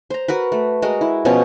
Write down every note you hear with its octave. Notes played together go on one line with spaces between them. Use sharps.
C5 A#5
F#4 A#4 B4
A3
G#3 F#4 A#4 D#5
E4
B2 F3 B3 C#4